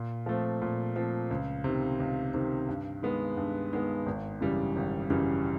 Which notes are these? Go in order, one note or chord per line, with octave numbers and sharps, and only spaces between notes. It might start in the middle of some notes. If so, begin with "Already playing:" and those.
Already playing: A#2
F3 A3 C4
A#2
F3 A3 C4
C#2
C3 D#3
C#2
C3 D#3
G2
D#3 G#3 B3
G2
D#3 G#3 B3
G#1
F#2 C#3 E3 G3
G#1
F#2 C#3 E3 G3